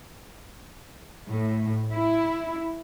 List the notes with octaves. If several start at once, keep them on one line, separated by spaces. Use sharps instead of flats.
A2
E4